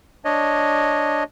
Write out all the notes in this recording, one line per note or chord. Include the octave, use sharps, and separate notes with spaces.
D4 C#5 D#5